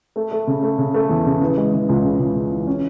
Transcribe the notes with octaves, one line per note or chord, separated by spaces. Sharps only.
A3
A3
C#3
A3
C#3
A3
E2
C#3
E3
G#3
E3
C#2
C#3
C#2
C#3
E3
C#4